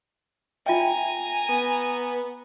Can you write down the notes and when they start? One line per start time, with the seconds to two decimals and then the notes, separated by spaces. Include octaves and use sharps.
0.66 F4 E5 G5 G#5 A#5
1.49 B3